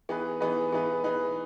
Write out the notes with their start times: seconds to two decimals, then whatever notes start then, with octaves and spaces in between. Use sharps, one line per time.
0.09 E3 B3 D#4 G#4 B4
0.41 E3 B3 D#4 G#4 B4
0.72 E3 B3 D#4 G#4 B4
1.04 E3 B3 D#4 G#4 B4